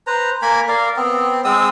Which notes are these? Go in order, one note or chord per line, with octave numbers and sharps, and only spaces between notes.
B4 C5 A#5
A#3 A#4 G#5 B5
A#4 D5 F5
B3 C4
G#3 C4 D#6 E6